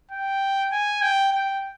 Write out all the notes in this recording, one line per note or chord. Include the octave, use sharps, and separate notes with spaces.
G5
G#5
G5
G5